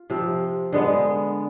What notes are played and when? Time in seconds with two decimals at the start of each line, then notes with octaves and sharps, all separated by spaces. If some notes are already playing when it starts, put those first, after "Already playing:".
Already playing: F4
0.10 C3 F3 C4
0.73 D3 G#3 B3